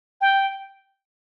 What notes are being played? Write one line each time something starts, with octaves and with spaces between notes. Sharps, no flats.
G5